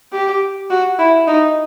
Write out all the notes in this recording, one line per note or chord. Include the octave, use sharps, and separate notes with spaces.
G4
F#4
E4
D#4